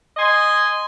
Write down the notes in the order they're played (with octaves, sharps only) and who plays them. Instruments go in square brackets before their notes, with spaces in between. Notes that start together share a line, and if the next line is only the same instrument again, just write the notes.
[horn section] D#5 G#5 C6